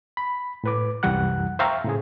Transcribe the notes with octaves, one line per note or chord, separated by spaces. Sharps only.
B5
A2 B4 D6
C2 F#2 E3 G3 F#5 F#6
C5 E5 F5 G5 A#5 C#6
A2 C#3 G#4